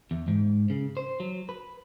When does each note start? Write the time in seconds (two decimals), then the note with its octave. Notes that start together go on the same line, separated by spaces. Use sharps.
0.11 E2
0.28 G#2
0.70 C#3
0.97 C5
1.20 F#3
1.49 B4